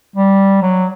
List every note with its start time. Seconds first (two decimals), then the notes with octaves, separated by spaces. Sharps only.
0.16 G3
0.62 F#3